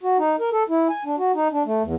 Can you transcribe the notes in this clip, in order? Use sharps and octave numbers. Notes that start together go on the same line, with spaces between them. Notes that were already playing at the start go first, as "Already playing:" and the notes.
F#4
D#4
A#4
A4
E4
G#5
D4
F#4
D#4
D4
A3
E2